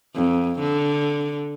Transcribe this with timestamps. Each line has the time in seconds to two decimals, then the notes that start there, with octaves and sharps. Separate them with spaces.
0.15 F2
0.60 D3